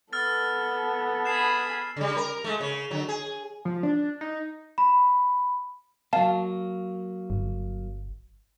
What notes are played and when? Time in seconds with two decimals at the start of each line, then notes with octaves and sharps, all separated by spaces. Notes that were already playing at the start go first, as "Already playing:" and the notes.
0.13 B3 A4 A5 E6 F6 A6
1.25 G#4 B5 C7 E7
1.97 C#3 G3
2.17 A#4
2.44 G#3 A3
2.61 C#3
2.91 D3 F#3
3.09 G#4
3.65 F3
3.83 D4
4.21 D#4
4.78 B5
6.13 F#3 A#3 F5 A5
7.30 G1